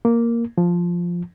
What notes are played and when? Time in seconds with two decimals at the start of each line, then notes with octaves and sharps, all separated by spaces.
0.05 A#3
0.58 F3